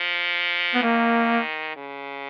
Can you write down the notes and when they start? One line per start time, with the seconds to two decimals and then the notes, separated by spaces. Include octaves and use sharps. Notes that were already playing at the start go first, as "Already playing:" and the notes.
Already playing: F3
0.74 B3
0.83 D#3 A#3
1.76 C#3